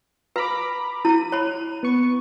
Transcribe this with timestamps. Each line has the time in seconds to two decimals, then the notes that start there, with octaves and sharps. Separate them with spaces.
0.36 B4 A#5 B5 D6
1.05 E4 D#7
1.32 C#5 B5
1.83 B3 C#6